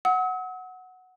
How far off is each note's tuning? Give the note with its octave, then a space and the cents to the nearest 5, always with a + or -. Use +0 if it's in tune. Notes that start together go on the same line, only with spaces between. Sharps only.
F#5 +0 E6 -45